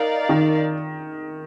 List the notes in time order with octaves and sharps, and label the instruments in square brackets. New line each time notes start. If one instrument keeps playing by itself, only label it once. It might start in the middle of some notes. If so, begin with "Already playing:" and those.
Already playing: [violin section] D#4 A#4 D5 F5
[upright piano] D#3